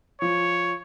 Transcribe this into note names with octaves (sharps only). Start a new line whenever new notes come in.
F3 C#5